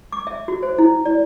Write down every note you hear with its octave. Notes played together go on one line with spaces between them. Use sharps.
D6
E5
F#4
C5
E4
D5